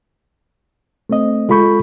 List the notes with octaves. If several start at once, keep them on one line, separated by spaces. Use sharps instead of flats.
A3 C4 D#5
G#3 F4 A4 B5 C#6 G6